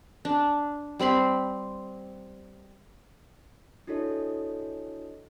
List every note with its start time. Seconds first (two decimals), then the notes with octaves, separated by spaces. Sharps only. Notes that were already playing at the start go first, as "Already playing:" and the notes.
0.25 D4
0.99 G3 C4 B5 C6
3.87 D4 E4 F#4 A4 C#5 D#5